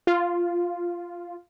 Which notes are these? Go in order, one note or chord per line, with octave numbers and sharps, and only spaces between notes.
F4